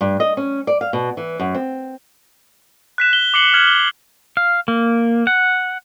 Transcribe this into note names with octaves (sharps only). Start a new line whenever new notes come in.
G2
D#5
C#4
D5
F5
B2
E3
F#2
C4
F#6 B6 E7
G7
D6 C7 C#7 F#7 G7
F6 G#6 F#7
G7
F5
A#3
F#5